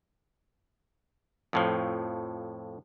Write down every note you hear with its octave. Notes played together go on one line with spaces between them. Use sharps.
F2 A2 F3